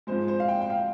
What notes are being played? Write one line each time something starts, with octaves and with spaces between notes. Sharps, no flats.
G#2 F3 G#3 C5
C5
F5
G5
G5
F5